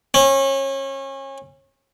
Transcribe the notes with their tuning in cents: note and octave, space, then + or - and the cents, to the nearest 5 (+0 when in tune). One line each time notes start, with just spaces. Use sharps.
C#4 -30